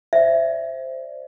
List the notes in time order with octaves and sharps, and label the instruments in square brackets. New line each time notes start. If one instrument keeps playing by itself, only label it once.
[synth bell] C5 D5 [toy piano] E5